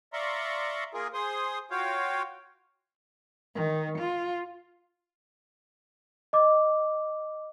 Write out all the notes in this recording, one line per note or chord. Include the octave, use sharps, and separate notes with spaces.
D5 E5 F5 A#5 C6 C#6
A#3 F4 G#4 A#4
G#4 C5 C6 D#6
F4 F#4 C#5 F5 G5
D#3
F4
D#5 D6